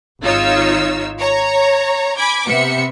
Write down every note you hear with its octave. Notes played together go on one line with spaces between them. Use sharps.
G#1 D#4 F4 C#5 E6
C#5 A#5
G#5 B5 D6 G#6
C3 B3 E5 C#7